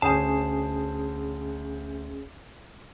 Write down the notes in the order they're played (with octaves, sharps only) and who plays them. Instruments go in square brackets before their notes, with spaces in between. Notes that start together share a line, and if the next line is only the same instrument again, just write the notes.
[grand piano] D2 D#6 G6 [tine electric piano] C#4 G#4 C7 [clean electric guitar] A5